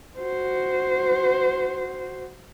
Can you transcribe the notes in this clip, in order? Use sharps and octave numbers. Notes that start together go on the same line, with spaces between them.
F#4 C5